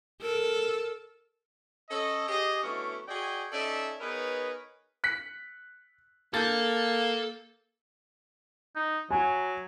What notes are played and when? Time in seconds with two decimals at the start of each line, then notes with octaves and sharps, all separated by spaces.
0.22 A4 A#4
1.90 C#4 A4 D#5
2.28 G4 G#4 D#5
2.63 F#3 A3 B3 C#4 D4 E4
3.08 F#4 G#4 D5 D#5 G5 G#5
3.52 C#4 D#4 A4 D5 E5
4.00 B3 D#4 G#4 A#4 B4 C#5
5.04 F#6 B6 C#7
6.34 A#3 A4 G6 A6
8.76 D#4
9.11 F#3 G#5